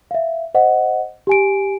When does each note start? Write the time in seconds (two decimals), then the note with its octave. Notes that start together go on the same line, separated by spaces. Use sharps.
0.11 E5 F5
0.55 C5 D#5 F#5
1.27 G4 G#5 D7